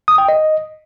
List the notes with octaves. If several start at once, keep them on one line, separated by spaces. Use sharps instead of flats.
D#6
G5
D#5